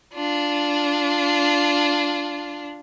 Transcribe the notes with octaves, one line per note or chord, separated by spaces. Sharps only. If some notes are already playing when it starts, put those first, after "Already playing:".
D4 F4